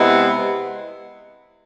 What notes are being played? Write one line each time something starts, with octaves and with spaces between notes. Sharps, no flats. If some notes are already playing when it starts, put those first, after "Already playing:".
Already playing: C3 G#3 B3 E4